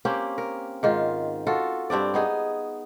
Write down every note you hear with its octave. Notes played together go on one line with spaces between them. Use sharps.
A#3 C4 C#4 G4
A#4
G#2 D#3 F4
F4 F#4 A4
G2 C4 D4 D5
B3 D#4 G#4